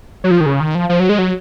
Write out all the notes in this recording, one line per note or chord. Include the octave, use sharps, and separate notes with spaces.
F#3
F3
D#3
C#3
D#3
F3
F3
F#3
G#3
F#3